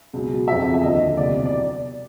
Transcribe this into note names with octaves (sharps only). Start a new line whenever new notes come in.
C#2 B2 F#3
F2 C#3 F3 E5
E5
D#2 D3 F3 D#5
C2 B2 F#3 D5
D5